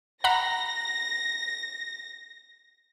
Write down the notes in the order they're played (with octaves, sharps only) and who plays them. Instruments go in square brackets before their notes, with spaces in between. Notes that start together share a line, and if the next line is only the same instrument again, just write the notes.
[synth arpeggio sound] F#5 A#5 B5 [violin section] A#6